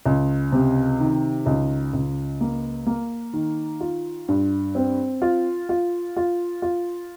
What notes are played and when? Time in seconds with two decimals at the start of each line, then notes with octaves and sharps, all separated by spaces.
0.06 C#2
0.52 C3
1.00 D#3
1.46 C#2
1.93 C#2
2.41 A#3
2.86 A#3
3.33 D#3
3.80 F4
4.28 G2
4.75 C4
5.22 F4
5.69 F4
6.17 F4
6.62 F4